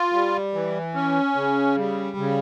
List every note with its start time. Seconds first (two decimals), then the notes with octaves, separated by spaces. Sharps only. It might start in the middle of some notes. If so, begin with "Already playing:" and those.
Already playing: F4
0.13 G3
0.54 E3
0.94 C#4
1.35 C#3
1.77 G3
2.17 C#3